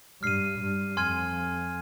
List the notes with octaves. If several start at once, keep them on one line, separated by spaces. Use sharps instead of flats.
G2 F6 C7 D#7
G2
F2 G#5 C6 F6 G#6 D#7